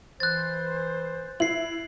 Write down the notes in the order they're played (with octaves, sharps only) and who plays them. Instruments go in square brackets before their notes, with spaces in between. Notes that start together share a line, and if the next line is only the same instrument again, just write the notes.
[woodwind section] E3 C5 [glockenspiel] F#6 A6
[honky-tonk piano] E4 [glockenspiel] C7 F#7